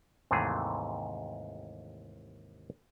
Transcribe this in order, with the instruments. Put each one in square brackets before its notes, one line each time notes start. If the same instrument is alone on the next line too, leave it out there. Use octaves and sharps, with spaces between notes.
[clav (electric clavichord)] D#2 G#2 C3 E3 A3 G#4